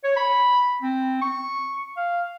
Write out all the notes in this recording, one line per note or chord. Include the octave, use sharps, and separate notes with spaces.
C#5
B5
C4
C#6
F5